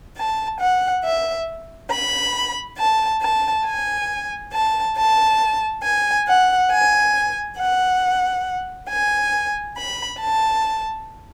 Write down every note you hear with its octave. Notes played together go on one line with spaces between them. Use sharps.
A5
F#5
E5
B5
A5
A5
G#5
A5
A5
G#5
F#5
G#5
F#5
G#5
B5
A5